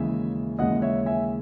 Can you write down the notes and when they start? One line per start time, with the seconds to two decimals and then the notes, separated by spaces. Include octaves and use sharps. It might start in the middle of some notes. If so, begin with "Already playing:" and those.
Already playing: D#2 C#3 E3 G#3 E5 G#5
0.59 D#2 C#3 E3 G#3 D#5 F#5
0.82 C#5 E5
1.06 E5 G#5